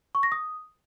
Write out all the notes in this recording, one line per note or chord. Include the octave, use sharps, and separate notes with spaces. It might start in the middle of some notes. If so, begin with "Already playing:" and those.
C#6
A#6
D#6